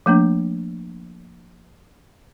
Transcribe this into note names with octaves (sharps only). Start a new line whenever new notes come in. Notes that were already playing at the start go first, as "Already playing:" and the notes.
F3 A3 A#3 D4